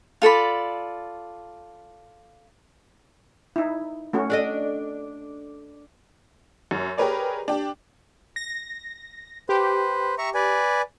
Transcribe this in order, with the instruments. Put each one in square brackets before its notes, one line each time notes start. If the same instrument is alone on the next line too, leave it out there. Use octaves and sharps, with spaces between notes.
[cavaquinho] F4 A4 D5 B5
[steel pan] D#4 E4
A3 C#4 F#4
[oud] D4 A4 D#5
[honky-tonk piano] F#2
G4 G#4 A#4 B4 C#5 D5
D4 G4
[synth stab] A#6
[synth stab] G4 [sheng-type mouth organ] B4 C5
[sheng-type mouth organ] E5 A#5 C#6
B4 D5 G#5